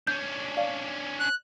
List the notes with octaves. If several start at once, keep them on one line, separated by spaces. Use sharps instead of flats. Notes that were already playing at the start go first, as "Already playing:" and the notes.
C#4 D4 G6
D5 F5
F#6